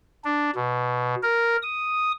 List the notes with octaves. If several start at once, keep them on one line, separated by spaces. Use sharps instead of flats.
D4
B2
A#4
D#6